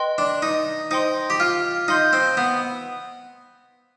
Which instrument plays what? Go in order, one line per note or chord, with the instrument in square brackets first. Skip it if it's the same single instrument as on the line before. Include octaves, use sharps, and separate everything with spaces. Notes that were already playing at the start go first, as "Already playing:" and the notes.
Already playing: [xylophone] B4 D#5 G5 C6
[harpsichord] D4
D#4
[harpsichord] D#4 [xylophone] C5 G5 C6
[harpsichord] G4
F4
[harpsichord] D#4 [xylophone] F5 C6 G6
[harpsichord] C4
B3